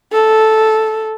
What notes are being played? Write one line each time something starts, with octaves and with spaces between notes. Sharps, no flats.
A4